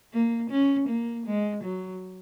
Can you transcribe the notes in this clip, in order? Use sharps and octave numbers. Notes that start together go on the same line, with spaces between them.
A#3
C#4
A#3
G#3
F#3